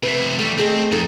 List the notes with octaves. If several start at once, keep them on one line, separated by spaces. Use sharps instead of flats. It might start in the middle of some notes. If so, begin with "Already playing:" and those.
C3 A3 B4
E3 G3 A3
A3 C4 G#4 D#5
F2 D#4 A4